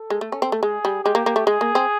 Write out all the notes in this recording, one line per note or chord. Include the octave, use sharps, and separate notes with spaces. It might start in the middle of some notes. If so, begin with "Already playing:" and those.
Already playing: A4
G#3
A3
C#4
C4
A3
G#3 G#4
G3
G#3 G4
A#3
A#3
A3
G#3 G#4
A#3
C4